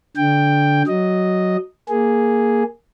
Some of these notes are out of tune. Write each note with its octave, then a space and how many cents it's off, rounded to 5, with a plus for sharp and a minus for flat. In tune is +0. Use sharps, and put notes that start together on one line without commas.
D3 -15 G5 +5
F#3 +0 D#5 +0
A#3 +0 G#4 +0